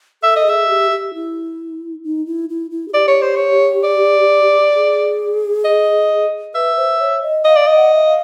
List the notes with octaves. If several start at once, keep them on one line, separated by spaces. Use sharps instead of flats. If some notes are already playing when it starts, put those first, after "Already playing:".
A4 E5
D#5
G#4 E5
G4
G4
E4
D#4
E4
E4
E4
G#4
G4 D5
C#5
C5
C#5
D5
G#4
D#5
B4 E5
C5
C#5
D#5
D#5 F5
D5
D#5
F#5
E5
F5